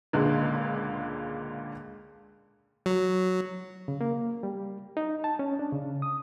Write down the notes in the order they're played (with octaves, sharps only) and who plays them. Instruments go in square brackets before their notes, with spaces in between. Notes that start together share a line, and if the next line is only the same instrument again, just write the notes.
[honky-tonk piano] C#2 A#2 D3 G#3
[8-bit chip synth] F#3
[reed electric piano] C#3
A#3
G3
D#4
A5
C#4
D4
C#3
D#6